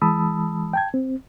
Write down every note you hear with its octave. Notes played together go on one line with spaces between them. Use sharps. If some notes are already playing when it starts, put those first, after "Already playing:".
E3 G#3 A5 B5 D#6 E6
G5 A5 G#6
C4